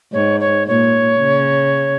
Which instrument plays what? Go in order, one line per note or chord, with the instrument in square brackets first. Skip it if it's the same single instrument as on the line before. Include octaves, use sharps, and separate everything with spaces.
[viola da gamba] G#2 [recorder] C#5
[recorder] C#5
[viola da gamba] A#2 [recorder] C#5
[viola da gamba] C#3